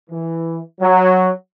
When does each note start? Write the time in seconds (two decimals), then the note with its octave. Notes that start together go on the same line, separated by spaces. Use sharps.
0.10 E3
0.80 F#3